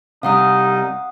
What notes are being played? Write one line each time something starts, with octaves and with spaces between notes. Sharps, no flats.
C3 G3 D#4 F5 F#5 D#6